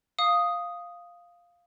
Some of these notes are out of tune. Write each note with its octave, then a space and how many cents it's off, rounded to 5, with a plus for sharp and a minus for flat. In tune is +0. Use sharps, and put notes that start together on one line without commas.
F5 +0 D#6 +0